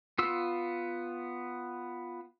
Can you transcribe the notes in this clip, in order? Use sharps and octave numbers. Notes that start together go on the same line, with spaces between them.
B3 F4 E6